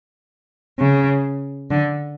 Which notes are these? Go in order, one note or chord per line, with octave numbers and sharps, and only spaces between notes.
C#3
D3